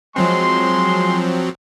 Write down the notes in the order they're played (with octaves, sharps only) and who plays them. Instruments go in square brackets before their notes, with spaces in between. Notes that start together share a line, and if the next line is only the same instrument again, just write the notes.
[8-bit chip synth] F3 F#3 C4 [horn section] G#3 C6